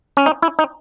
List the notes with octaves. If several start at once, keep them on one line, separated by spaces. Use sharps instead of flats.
C#4
D#4
E4
D#4